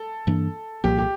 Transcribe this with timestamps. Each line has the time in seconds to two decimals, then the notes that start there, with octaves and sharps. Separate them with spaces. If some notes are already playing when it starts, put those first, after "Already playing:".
Already playing: A4
0.27 G2 E3 A#3 D4
0.84 C2 A#2 F3 A#3 G4
0.98 G4